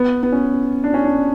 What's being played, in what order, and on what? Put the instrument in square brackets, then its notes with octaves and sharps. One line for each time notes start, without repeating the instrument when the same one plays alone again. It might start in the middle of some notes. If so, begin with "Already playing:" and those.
Already playing: [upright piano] B3
B3
C#4
D4
C#4
D4